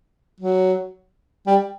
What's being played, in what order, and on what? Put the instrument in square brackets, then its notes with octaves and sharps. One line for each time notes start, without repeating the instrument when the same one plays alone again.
[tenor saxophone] F#3
G3